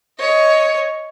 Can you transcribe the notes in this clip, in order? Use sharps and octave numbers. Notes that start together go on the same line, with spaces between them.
C#5 D#5